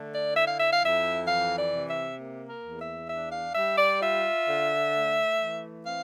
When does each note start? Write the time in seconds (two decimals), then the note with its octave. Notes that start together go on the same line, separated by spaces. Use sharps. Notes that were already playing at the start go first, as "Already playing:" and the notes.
Already playing: D3 A3
0.12 D5
0.34 E4 E5
0.46 F5
0.58 E5
0.70 F5
0.80 F2 E5
1.25 E3 F5
1.56 D5
1.72 C3
1.87 E5
2.17 A#3
2.47 A#4
2.63 E2
2.79 E5
3.08 D4 E5
3.31 F5
3.54 G3 E5
3.77 D5
4.00 F4 E5
4.47 D3
4.92 A3
5.38 E3
5.84 C4 F5